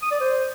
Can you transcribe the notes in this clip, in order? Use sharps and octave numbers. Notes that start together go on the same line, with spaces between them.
D#6
D5
C5